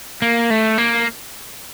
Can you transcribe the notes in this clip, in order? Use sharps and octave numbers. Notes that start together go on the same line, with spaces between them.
A#3
A3
A#3